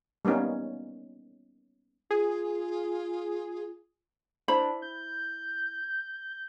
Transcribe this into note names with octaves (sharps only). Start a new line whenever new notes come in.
G3 A#3 B3 C#4 D#4
F4 G#4
D4 E4 C5 B5
G6